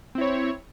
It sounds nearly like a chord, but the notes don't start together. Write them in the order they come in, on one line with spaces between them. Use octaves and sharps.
C4 E4 C#5